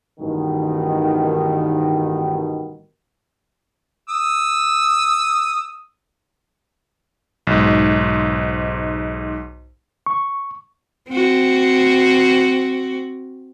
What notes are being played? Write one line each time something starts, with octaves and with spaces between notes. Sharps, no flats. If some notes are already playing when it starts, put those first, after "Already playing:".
A1 G2 B2 D#3
D#6 E6
B1 G#2
C#6
C4 F#4